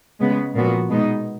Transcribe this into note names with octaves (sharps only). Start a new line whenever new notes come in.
C#3 G#3 B3
A#2 F3 B3 F#4
B2 G#3 B3 D#4